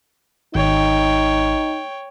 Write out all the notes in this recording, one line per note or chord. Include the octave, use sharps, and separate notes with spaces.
G#1 D#4 C#5 G5